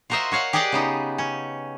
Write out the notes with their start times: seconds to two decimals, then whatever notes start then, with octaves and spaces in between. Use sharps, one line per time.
0.10 F4 F#4 A#4 C5 D#5 E5
0.31 F#4 C#5 F5 F#5
0.53 G4 G#4 D5 D#5 F#5 G5
0.72 C#3 B3 D#4
1.18 C#4